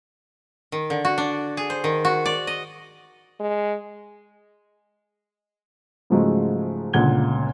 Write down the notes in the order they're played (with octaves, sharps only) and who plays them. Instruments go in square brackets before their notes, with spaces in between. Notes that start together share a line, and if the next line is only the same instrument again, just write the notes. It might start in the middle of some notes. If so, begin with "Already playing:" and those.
[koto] D#3
D3
F#4
D4
G#4
C5
D#3
F#4
D5
D#5
[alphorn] G#3
[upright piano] G#2 C#3 F3 F#3 G#3 A3
G1 C#2 A#2 F#5 G#6 G7